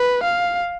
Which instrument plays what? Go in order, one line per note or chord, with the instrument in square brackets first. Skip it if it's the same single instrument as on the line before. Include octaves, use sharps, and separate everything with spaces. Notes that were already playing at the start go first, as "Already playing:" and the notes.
Already playing: [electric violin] B4
F5